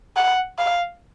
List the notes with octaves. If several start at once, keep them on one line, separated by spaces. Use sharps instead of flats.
F#5
F5